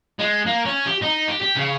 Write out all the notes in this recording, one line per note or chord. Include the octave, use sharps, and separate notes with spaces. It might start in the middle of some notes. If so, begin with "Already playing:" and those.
G#3
A#3
C#4
G4
D#4
G4
G4
C#3